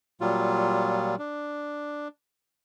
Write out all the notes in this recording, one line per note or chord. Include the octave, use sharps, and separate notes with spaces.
A#2 F#3 G3 F4
D4